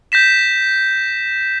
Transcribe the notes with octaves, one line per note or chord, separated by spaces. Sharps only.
G6 A#6 B6 E7